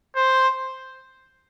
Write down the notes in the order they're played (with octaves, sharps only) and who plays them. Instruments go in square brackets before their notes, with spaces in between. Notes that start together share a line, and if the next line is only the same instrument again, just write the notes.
[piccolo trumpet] C5